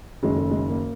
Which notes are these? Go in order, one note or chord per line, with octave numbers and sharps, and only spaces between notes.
F#1 F#2 D#3 G#3
A3
G#3
A#3